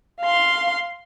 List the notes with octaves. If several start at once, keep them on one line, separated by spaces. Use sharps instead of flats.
F5 C6